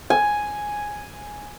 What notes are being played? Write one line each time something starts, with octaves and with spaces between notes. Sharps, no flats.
G#5